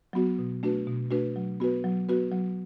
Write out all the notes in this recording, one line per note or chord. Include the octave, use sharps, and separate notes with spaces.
F#3 B3 F#4
B2
A3 D4 F#4 B4
B2
A3 D4 F#4 B4
F#3
B3 F#4 B4
F#3
B3 F#4 B4
F#3